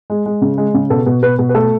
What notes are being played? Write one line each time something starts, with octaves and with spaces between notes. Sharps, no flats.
G#3
G#3
C#3
G#3
C#3
B2 A4
B2
B2 B4
B2
B4
A3 A4